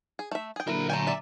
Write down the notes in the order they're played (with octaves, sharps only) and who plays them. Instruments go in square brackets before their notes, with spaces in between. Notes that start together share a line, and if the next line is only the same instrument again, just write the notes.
[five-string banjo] G#4
A3 E5
G#4 G5
[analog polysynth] A#2 D3 F#3 [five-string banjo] E4 [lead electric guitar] A#4 B5
[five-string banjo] A3 C#5 G5 [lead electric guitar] G#5 A#5
[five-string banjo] D5 E5